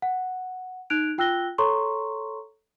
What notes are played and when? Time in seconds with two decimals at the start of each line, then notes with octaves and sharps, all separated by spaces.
0.02 F#5
0.90 D#4 F#6 G#6 D7 F7
1.18 F4 G5 E6 F#6 A#6 G7
1.58 A4 C#5 A#5 C6 C#6